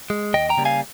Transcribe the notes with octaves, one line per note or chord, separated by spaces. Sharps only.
G#3
D#2 D#5 G5
G5 A#5
C#3 G3 A#3
F5 G#5